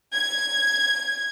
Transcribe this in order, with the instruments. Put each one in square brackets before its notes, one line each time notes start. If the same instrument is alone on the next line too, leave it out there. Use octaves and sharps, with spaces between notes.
[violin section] G#6